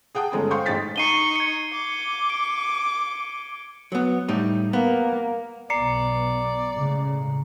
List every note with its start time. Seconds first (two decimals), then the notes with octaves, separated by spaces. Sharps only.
0.15 G#4 F#5 G5 A5 D#6
0.32 G1 G#3 A3 C#4 A#5
0.51 C5 F5 G5 C6 C#6 G6
0.66 A1 G#2 G#4 G5 A6 B6
0.96 D#4 C#6 C7 D#7 G7
1.36 G#6 C#7
1.73 D6
2.30 D7
3.92 F#3 B3
4.28 A2 G3 D#4
4.73 A#3 B3
5.70 B1 B3 D5 A#5 C7 C#7
6.73 A2 C#3 G#3